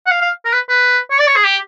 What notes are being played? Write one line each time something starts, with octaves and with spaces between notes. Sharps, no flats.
F#5
F5
F5
A#4
B4
B4
C#5
D5
C#5
G#4
G4